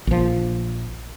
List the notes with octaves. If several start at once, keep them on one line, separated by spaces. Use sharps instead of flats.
A#1 F3